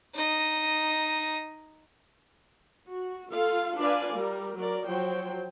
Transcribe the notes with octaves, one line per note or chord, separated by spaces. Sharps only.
D#4 D#5
F#4
F4 A4 F5
D4 F4 B4 D5 F5 G#5
G3 A#4
F#3 A#4 D5
F3 F#3 C5 G5